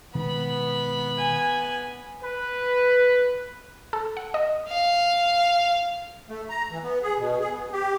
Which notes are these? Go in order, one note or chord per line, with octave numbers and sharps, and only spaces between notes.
B2 D#3 G#3 B3 B5
G#5
B4
A4
F#5
D#5
F5
A3
A#5
E3
B3
G#4
B2
G#4
B3
G4